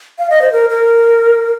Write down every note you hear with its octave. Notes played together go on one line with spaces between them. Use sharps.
F5
D#5
C5
A#4
A#4